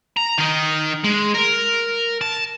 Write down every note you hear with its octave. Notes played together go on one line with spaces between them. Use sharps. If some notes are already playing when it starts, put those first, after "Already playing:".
A#5
D#3 D#4
G#3
A#4
A5